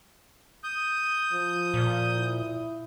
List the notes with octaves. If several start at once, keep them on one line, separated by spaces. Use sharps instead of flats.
D#6 G6
F3
A#2
E4